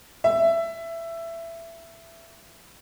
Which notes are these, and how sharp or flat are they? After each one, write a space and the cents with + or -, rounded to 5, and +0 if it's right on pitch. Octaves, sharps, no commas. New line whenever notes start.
E5 +15